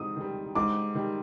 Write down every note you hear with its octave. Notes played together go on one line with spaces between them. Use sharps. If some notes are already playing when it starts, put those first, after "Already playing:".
Already playing: G#2 D#3 G3 D#6
D#3 G3
G#2 D6
D#3 G3